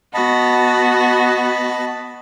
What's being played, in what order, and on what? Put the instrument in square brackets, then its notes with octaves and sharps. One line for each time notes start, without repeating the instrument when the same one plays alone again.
[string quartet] B3 F#4 [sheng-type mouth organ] D#5 A5 B5